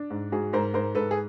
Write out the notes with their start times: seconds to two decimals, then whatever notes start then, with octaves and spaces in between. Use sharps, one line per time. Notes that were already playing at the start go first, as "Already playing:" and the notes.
Already playing: D4
0.10 G#2
0.32 G#2 F#4 G#4
0.53 G#2 A#4 C5
0.74 G#2 A#4 C5
0.95 G#2 A4 B4
1.11 G#4